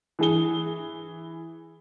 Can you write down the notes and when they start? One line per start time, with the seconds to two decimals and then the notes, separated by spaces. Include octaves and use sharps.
0.19 E3 G#4 G7